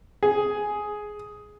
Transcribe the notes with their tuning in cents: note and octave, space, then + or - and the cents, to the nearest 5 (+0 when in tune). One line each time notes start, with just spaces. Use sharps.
G#4 +10